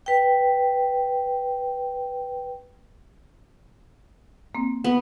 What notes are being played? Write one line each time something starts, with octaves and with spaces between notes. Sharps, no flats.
B4 G5
A#3 C4
B3